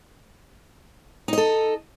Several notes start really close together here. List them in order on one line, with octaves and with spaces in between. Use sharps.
D#4 D#5 A4